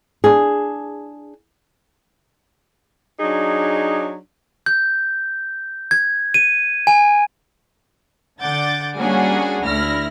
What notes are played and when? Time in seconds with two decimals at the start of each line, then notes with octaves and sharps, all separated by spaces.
0.24 D4 G#4
3.20 F#3 D4 D#4 G#4
4.66 G6
5.91 G#6
6.34 D#7
6.87 G#5
8.41 D3 F#5 D6 G6 A6
8.96 G3 A#3 C#4 D4 F#4 G#4
9.63 D2 E4 F6 A#6